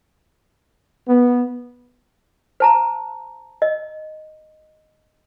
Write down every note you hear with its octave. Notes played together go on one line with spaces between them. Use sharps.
B3
C5 A5 A#5
D#5